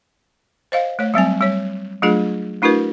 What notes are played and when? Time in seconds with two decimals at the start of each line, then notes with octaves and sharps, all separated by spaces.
0.72 C5 D#5 F5
0.99 A3 C#5
1.14 F#3 G3 C4 G#5
1.41 G3 C#5
2.03 F#3 A3 D4 F4 G#4
2.62 A3 D4 E4 F#4 A#4 B4